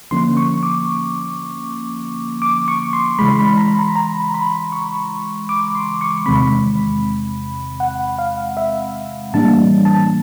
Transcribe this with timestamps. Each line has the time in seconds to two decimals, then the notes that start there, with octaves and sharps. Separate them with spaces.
0.11 D3 F3 A#3 C#4 C6
0.37 C#6
0.63 D6
2.42 D6
2.68 C#6
2.93 C6
3.19 C#3 E3 G#3 B5
3.29 C6
3.39 B5
3.57 A#5
3.68 B5
3.79 A#5
3.95 A#5
4.34 B5
4.72 C#6
5.49 D6
5.75 C6
6.01 C#6
6.26 E2 C3 D#3 G#3 C4 B5
7.80 F#5
8.18 F5
8.57 E5
9.34 A2 E3 G3 A#3 D4 A5
9.85 A5